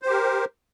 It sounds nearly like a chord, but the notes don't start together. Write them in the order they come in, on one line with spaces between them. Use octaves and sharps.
C5 G4 A#4